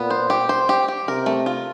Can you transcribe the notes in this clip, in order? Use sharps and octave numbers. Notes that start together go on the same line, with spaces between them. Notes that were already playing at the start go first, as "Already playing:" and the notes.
Already playing: A#2 B3
C5
G4
C5
G4
G4
C3 A#4
A3
F4